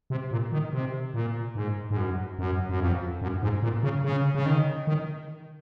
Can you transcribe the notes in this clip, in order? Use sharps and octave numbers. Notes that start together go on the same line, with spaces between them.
C3
A#2
D#3
C3
A#2
G#2
G#2
F#2
F#2
F#2
F2
F#2
G#2
A#2
C#3
C#3
C#3
D#3
D#3